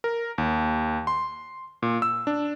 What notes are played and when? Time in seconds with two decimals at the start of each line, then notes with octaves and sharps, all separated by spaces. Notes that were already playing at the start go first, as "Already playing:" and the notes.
0.04 A#4
0.38 D#2
1.07 C6
1.82 A#2
2.02 E6
2.27 D4